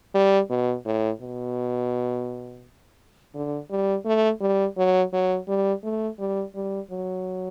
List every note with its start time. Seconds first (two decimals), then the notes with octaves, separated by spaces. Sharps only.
0.15 G3
0.50 B2
0.85 A2
1.21 B2
3.35 D3
3.71 G3
4.06 A3
4.41 G3
4.78 F#3
5.13 F#3
5.48 G3
5.84 A3
6.19 G3
6.55 G3
6.91 F#3